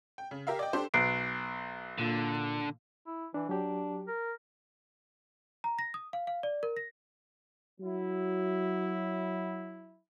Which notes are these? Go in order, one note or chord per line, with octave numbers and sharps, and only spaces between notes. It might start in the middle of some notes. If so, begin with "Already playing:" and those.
G5
C#3
G4 A#4 E5 F5
D5 D#5 G5
D4 G4 A4 C5
B1 F#6 C7 D7
A#2 D3
E4
E3 D4
F#3 D4 G4
A#4
A#5
A#6
D#6
F5
F5
D5
A#4
A#6
F#3 E4